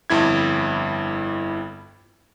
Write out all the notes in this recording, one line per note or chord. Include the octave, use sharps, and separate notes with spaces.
G1 F2 E4 G#6